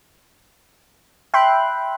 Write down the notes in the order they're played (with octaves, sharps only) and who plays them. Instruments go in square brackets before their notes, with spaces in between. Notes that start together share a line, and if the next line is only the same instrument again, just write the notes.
[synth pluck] E5 G5 B5 C6 F#6